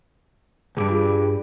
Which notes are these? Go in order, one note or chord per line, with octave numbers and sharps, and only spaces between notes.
C#2 G2 G#4 D6 D7
F4 G#4